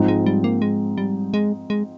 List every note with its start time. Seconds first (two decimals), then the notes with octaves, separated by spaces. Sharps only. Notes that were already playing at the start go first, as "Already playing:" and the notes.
Already playing: G#2 F3 C4 D#4
0.08 G#3
0.26 G3
0.44 A#3
0.62 G#3
0.98 G3
1.34 G#3
1.70 G#3